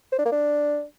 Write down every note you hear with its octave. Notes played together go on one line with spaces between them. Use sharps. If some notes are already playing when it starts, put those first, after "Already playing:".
C5
D4
A#3
D4